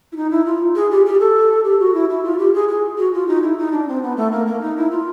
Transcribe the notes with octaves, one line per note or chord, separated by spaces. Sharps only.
E4
D#4
E4
F4
G#4
G4
G4
A4
G4
F#4
E4
E4
F4
G4
G#4
G#4
F#4
F4
D#4
E4
D#4
D4
C4
B3
A3
A#3
A#3
D#4
E4
F4